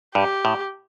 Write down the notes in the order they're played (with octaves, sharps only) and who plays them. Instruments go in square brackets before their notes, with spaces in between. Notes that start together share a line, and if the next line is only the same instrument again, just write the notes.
[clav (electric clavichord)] G2 [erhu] G4
[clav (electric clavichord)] A2